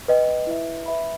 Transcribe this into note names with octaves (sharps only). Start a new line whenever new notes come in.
B4 D#5 G5
E4 B4 E5
B4 E5 B5